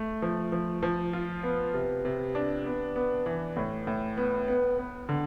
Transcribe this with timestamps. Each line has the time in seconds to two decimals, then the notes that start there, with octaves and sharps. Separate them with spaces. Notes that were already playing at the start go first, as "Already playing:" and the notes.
Already playing: A3
0.22 F3
0.52 F3
0.83 F3
1.13 F4
1.43 B3
1.74 C3
2.05 C3
2.35 D4
2.65 B3
2.96 B3
3.26 E3
3.57 A2
3.87 A2
4.17 B3
4.48 B3
4.78 B3
5.09 D3